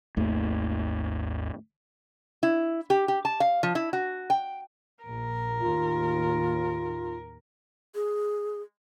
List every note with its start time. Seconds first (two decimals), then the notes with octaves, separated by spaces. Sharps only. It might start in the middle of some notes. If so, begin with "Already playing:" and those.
0.17 G#1 D#2 A3
2.43 E4
2.90 G4
3.08 G4
3.25 A5
3.40 F5
3.63 F3
3.75 E4
3.93 F#4
4.30 G5
5.04 A#1 A#4
5.61 D#2 A2 D#3 F4
7.95 G#4